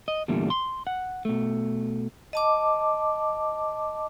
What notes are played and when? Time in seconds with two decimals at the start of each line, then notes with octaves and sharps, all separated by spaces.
0.08 D#5
0.28 E2 A#2 D3 G3 A3
0.50 C6
0.87 F#5
1.25 B2 A3
2.33 D#5 A5 D6